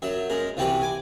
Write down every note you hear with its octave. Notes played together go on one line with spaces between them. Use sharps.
F#2 F#3 E5
F#2 G#3 A#4
C2 E3 G3 C4 F#4 B4
G#5 D6